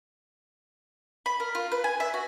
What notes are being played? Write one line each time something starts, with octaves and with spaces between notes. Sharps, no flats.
B5
A#4
F4
B4
G#5
E5
F#4